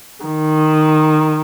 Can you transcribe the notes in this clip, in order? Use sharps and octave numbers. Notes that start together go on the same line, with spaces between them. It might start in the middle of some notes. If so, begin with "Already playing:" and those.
D#3